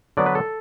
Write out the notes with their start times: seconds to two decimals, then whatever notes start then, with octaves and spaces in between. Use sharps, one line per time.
0.17 D3 F#3 B3 D4 D5
0.26 B4
0.35 A4